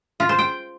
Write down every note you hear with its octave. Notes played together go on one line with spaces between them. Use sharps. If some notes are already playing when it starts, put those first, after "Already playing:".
F4
C5
G5